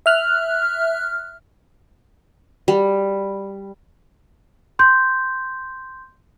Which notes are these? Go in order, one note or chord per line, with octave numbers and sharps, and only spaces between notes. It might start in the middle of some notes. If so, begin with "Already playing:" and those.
E5 F6 F#6
G3
C6 G6